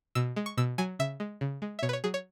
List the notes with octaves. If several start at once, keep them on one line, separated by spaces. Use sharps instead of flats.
B2 E6
G#3
C#6
B2 E6
F#3 G#5
C#3 E5
G#3
C#3
G#3
E5
B2 C#5
B4
C#5
F#3 G#4
C#5